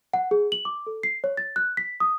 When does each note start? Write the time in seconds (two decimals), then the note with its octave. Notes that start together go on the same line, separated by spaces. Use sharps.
0.13 F#5
0.31 G#4
0.52 F#7
0.65 D6
0.87 A4
1.03 C7
1.24 C#5
1.37 A6
1.56 F#6
1.77 B6
2.00 D#6